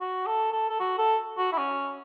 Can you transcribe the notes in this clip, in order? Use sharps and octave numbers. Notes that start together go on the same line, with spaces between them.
F#4
A4
A4
A4
F#4
A4
F#4
E4
C#4